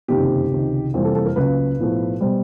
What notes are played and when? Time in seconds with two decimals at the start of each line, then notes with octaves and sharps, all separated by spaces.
0.08 F#1 F2 C3 D#3 G4
0.51 C#2 C3 D#3
0.94 F2 C3 E3 G3 A#3
1.05 A4
1.15 A4
1.26 A#4
1.36 C#2 C#3 F#3 A#3 B4
1.79 B1 A2 F3 A3
2.21 B2 G3 C5